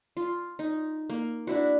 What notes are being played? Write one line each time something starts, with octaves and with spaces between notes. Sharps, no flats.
F4
D#4
A#3
D4 E4 F#4